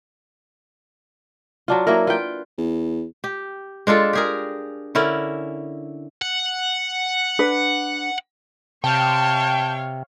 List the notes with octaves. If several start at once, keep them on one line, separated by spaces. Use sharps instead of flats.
F#3 D4 F4
F#3 A#3 E4 A#4
F4 B4 G5
E2
G4
G#3 D4 F4 A4
G4 G#4 A#4
D3 C#4 E4 A#4
F#5
D4 B4
C3 C#5 F5 G5 A5